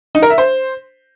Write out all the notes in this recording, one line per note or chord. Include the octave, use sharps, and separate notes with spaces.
D#4
A#4
E5
C5